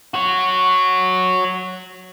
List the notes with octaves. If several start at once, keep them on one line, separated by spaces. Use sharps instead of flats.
F#4 C#5